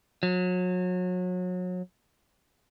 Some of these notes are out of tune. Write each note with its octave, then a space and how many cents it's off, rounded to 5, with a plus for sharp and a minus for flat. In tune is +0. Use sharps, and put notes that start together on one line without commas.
F#3 -30